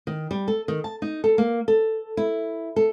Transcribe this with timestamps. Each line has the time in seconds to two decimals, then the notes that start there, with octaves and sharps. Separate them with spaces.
0.07 D#3
0.31 G3
0.48 A4
0.68 D#3
0.84 A5
1.02 D#4
1.24 A4
1.38 A#3
1.68 A4
2.17 E4
2.76 A4